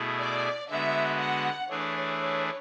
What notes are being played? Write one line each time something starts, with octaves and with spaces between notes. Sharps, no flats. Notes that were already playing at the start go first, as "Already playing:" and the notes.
Already playing: B2 A3 E4 G#4
D5
D3 G#3 B3 F#4 E5
F#5
E3 A3 D4 G#4 C#5
C#5